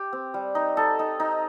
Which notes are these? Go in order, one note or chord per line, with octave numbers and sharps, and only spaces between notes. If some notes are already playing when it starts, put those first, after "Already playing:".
Already playing: G4
C4
G3
D#4
D#4 A4
D#4
D#4